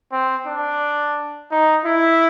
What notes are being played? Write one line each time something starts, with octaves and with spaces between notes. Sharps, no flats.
C4
D4
D#4
E4